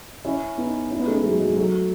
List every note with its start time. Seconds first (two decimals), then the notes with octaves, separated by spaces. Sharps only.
0.25 C#4 E4
0.58 B3 D#4
0.91 C#4 E4
0.98 B3 D#4
1.07 A3 C#4
1.15 G#3 B3
1.23 F#3 A3
1.31 G#3
1.40 F#3
1.48 G#3
1.56 F#3 A3